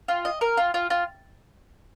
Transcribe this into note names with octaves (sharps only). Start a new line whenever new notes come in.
F4
D#5
A#4
F4
F4
F4